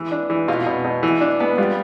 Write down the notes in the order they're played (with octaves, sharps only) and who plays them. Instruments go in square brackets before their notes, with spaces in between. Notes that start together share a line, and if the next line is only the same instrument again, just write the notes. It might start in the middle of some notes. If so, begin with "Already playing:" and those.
Already playing: [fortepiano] E3
D4
E3
B2 F4
B2
B2
E3
D4
B3
G3 F4